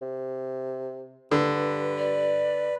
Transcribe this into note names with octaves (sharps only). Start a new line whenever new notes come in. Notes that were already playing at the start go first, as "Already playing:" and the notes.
C3
G2 D3 B4
D5